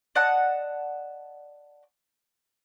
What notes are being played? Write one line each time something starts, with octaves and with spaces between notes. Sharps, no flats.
D5 D#5 F#5 A5